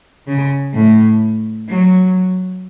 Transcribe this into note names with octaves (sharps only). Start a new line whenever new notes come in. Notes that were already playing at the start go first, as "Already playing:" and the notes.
C#3
A2
F#3